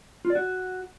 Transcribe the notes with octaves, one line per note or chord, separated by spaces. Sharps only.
F4
D5
F#4